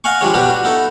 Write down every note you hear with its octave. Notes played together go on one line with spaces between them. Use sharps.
D#5 F5 F#5 G#5 C#6
F3 G3 G#3 D4 C#5
B2 G3 B3 D4 G4 B4
F#4
B3 D#4 E4 A4